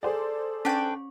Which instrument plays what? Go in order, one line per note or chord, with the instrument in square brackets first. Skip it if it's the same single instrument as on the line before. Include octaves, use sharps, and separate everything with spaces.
[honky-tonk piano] G#4 C5 D5 [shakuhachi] A4
[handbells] C#4 C#6 [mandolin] D4 B4 G5